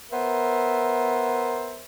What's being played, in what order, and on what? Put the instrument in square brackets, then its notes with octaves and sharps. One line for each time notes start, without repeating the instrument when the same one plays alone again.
[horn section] B3 A#4 C5 E5